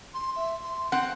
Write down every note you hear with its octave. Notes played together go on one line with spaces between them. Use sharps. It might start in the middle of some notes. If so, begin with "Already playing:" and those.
C6
E5
C6
C4 F#5 C6